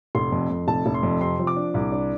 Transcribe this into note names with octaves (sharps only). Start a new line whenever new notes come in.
F1 C6
F2
F2
F1 A5
F1
C6
F2
C3 C6
F3
D6
D4
C2
D4